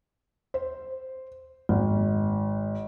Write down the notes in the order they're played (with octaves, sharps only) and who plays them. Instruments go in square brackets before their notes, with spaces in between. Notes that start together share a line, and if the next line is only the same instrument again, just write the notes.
[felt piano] C5
G#1